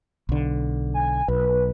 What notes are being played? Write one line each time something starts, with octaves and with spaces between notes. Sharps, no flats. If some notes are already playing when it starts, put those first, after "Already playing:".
B1 D3
G#5
B1 B4